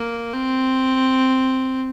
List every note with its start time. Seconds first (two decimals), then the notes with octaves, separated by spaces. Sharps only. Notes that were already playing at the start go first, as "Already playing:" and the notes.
Already playing: A#3
0.33 C4